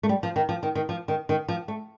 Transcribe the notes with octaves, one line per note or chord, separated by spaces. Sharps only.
A3
G3
F3
D#3
F3
D#3
D#3
F3
D#3
D#3
F3
A3